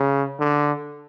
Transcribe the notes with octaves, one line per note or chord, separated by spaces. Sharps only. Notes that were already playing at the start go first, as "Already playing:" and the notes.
Already playing: C#3
D3